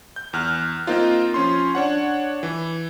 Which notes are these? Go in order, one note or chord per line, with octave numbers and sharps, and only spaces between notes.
G6
E2 F6 F#6
A#3 C4 D#4 F4
F3 C#4 C6
D4 C#5 F#5
E3